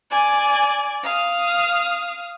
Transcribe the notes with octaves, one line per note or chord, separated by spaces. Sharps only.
D5 G#5
F5 D#6